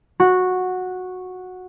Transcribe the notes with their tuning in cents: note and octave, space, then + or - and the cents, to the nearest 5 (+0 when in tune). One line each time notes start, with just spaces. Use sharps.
F#4 -10